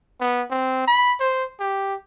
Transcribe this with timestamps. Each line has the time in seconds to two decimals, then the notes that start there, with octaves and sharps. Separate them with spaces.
0.21 B3
0.51 C4
0.87 B5
1.20 C5
1.60 G4